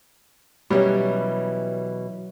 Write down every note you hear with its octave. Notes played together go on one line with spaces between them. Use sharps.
B2 E3 F#3 G3 C#4